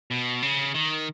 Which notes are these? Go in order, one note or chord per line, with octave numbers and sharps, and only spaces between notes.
B2
C#3
D#3